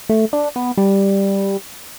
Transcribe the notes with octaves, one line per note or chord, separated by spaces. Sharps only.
A3
D4
B3
G3